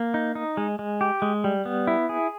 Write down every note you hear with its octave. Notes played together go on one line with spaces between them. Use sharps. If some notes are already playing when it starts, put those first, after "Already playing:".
Already playing: A#3
D#4
D#4
G#3
G#3
G4
G#3
G3
B3
E4
G#4